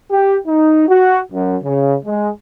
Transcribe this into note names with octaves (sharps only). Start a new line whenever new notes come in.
G4
D#4
F#4
F#2
C#3
G#3